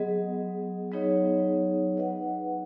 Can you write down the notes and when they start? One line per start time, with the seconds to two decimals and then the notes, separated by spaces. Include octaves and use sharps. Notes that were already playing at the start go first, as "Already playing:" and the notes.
Already playing: F#3 B3 G#4 D#5
0.92 F#3 B3 D#4 G#4 C#5
1.96 D#4 B4 D#5 F#5